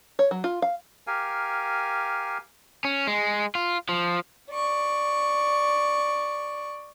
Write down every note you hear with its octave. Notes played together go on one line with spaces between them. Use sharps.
C#5
F#3
F4
F5
G4 A#4 F5 G#5
C#4
G#3
F4
F3
D5 C#6